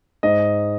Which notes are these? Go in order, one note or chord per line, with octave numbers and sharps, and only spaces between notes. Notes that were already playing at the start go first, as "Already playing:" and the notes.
G#2 D#5